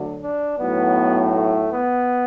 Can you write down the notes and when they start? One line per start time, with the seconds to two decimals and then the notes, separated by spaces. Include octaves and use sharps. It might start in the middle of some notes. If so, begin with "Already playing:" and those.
Already playing: D2 D3 F#3
0.22 D4
0.59 B1 A2 F#3 B3
1.34 A3
1.71 B3